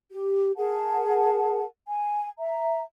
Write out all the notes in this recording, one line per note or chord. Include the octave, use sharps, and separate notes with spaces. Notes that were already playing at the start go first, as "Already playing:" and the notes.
G4
G#4 A#4 F#5 A5
G#5
E5 A#5